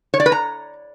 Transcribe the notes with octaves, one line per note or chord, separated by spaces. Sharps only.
C#5
D5
B4
A#5